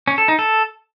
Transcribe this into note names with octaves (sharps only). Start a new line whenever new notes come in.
C#4
A4
D#4
A4